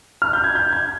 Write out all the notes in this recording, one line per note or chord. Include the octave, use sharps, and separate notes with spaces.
F6
G6
G#6
G6
G#6